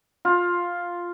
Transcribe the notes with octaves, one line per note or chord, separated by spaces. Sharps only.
F4